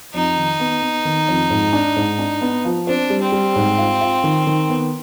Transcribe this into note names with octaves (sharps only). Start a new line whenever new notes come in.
F2 D#4
D#3
B3
B3
D#3
F2
G#2
D4
G#2
D4
B3
F3
C4 D4
G3
C4
G3
G#2
F4
F4
D#3
D#3
B3